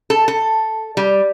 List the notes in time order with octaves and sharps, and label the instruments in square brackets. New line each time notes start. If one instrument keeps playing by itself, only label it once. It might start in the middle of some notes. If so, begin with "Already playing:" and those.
[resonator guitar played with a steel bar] A4
A4
G3